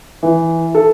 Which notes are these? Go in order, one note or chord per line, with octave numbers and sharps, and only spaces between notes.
E3
A4